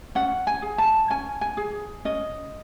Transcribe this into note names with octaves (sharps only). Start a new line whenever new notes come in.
C#4 F#5
G#5
G#4
A5
C#4 G#5
G#5
G#4
C#4 D#5